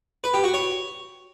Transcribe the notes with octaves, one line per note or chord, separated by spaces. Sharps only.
B4
G4
F#4
C#5